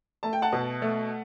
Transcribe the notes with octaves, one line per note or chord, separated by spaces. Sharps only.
A3 A5
G5
F#5 A5
B2
A3